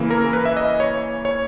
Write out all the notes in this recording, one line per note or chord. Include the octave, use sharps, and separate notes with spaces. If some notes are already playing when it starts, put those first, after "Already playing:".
Already playing: C#3 E3 A#3
A#4
B4
E5
D#5
C#5
C#5